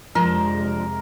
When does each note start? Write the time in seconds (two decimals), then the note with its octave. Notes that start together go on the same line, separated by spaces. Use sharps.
0.15 F2 C3 F3 G#3 D4 A#4